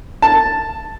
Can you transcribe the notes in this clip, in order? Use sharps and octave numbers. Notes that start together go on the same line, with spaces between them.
A5